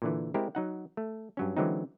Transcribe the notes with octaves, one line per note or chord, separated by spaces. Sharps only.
A#2 D3 E3
G#3 C4 E4 G4 A#4 C5
F#3 D#4 F#5
A3
G2 F#3 C#4
D3 E3 F#3 G#3 C4 D#4